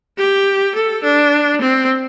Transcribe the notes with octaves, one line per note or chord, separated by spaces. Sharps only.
G4
A4
D4
C4